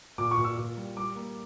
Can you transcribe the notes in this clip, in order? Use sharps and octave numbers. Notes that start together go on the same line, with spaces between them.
A#2 D6
C#6
A#2
E6
A#2
G3
G3 D6
A#3